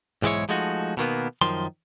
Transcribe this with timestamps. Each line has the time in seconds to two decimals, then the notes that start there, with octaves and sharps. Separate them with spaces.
0.22 B1 G#2 E3 G#3 E4 C#5
0.49 F3 G#3 A3 D#4 F#4
0.97 B2 D#3 A#3 B3
1.41 F#2 D#3 F3 C6